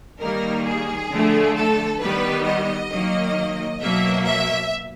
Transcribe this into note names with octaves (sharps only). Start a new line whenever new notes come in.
D#3 G3 A#3 A#4
G#4
D3 F3 A3
A4
D#3 G3 B3 B4
D#5
D#3 F#3 A#3
B2 F#3 A#3 E5
E5